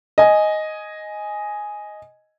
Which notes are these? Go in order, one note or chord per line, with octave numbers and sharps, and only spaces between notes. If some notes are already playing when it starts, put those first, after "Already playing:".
D#5 G#5